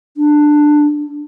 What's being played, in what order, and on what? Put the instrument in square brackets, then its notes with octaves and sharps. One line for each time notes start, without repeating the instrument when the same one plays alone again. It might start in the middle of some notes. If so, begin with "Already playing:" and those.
[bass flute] D4